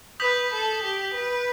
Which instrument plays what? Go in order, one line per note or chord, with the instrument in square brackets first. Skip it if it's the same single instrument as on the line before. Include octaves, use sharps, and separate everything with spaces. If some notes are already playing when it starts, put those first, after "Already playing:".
[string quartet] B4 [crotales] D#6 G6 B6 F#7
[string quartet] A4
G4
B4